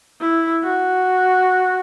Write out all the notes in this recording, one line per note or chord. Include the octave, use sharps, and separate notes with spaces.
E4
F#4